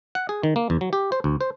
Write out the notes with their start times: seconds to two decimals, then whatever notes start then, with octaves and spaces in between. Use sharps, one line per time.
0.15 F#5
0.29 G#4
0.43 D#3
0.56 A#3
0.70 E2
0.81 F#3
0.93 G4
1.12 C5
1.24 D2
1.41 C5